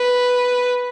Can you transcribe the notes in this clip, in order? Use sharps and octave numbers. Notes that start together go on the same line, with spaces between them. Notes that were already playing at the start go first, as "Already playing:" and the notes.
Already playing: B4